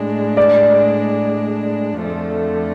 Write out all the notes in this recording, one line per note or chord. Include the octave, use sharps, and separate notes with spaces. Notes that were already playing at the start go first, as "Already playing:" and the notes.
Already playing: A2 G#3 D4
D5
F2 D3 F3 A3